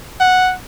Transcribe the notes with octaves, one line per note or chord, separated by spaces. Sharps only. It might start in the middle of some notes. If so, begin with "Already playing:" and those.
F#5